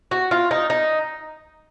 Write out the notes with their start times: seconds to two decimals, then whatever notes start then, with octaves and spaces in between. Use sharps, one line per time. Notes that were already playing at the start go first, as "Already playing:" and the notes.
0.11 F#4
0.31 F4
0.51 D#4
0.70 D#4